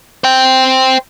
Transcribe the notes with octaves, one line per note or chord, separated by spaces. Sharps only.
C5 G5